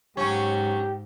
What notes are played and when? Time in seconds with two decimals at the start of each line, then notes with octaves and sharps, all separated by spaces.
0.17 G#2 F#3 C#4 G4